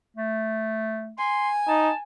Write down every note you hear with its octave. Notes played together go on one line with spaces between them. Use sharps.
A3
G#5 C6
D#4 A5